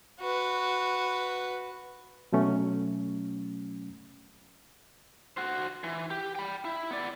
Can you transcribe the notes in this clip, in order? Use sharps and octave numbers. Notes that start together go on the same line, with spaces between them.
F#4 B4
B2 F#3 A3 C#4
F#4 C5
E3
G4
G5 B5
E4
B3 D5